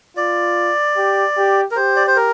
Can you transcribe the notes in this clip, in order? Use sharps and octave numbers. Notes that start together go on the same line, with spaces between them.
F4 D5
G4
G4
A#4
G4 C5
D5
C5
A#4